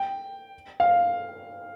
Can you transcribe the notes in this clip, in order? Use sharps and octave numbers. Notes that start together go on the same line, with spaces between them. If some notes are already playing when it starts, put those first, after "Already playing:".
Already playing: G5
F5